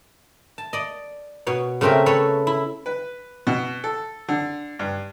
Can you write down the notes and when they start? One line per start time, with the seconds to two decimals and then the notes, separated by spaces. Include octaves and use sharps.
0.58 A5
0.73 D5 D#5
1.47 B2 C#5
1.81 C#3 A3 C4 A#4 E5
2.06 A4 B4 C#5
2.47 E4
2.86 B4
3.47 B2
3.84 A4
4.28 D3
4.79 G2